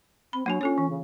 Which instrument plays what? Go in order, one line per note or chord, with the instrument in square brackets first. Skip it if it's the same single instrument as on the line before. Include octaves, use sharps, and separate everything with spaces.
[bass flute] C4 [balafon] B5
[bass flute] F#3 [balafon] A#3 D4 G#5
[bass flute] C#4 [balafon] F4 A4 C#5
[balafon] E3
[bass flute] C#3